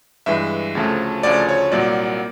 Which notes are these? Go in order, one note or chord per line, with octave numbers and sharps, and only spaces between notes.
G2 E3 G#3 E5
D2 C#3 F3 A3
D2 C#3 F3 A3 D5
C#5
C2 A#2 F#3 A#3 D5